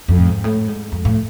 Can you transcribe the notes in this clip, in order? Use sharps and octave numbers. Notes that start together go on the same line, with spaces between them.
F2
A2
G#2
A2
G#2
F2
A2